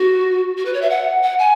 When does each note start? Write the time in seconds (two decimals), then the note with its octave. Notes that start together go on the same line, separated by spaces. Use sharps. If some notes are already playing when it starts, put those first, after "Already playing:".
Already playing: F#4
0.57 F#4
0.66 B4
0.74 C#5
0.82 E5
0.90 F#5
1.23 F#5
1.39 G#5